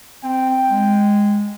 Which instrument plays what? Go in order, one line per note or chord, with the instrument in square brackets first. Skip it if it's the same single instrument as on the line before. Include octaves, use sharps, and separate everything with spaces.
[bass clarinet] C4 [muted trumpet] G5
[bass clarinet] G#3